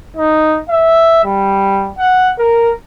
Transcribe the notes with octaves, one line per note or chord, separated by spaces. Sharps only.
D#4
E5
G3
F#5
A#4